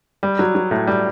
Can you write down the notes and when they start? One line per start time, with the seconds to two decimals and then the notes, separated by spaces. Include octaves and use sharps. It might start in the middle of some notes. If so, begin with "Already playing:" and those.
0.23 G3
0.39 F#3
0.55 F#3
0.71 A2
0.87 G3